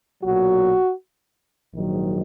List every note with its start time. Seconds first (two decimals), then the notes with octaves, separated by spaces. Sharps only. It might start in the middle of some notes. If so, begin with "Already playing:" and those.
0.22 B1 A#2 F#3 F#4
1.72 A#1 G#2 D#3 F#3